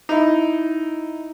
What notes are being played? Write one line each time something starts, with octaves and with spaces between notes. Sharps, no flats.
D#4 E4